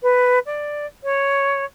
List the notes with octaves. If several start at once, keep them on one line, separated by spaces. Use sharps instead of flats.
B4
D5
C#5